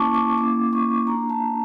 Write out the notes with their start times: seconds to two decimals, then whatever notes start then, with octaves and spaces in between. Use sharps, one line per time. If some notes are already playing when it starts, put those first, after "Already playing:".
Already playing: A#3 C#4 E4 A5 C#6 D6
0.14 D6
0.38 A#3 C#4 E4 D6
0.73 C#6
1.07 A#3 D4 F4 A#5
1.29 A5